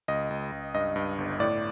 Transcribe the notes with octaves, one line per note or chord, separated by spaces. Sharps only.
C#2 D#5
C#2
C#2
G2 D#5
G2
G1
A2 D5